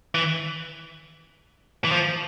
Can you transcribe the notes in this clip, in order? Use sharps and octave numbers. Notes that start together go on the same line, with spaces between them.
E3
E3
F3